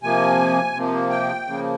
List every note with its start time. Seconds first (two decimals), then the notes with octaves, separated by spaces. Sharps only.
0.02 C3 F3 A#3 G#5
0.74 C3 F3 A#3
1.10 G5
1.46 C#3 F3 A#3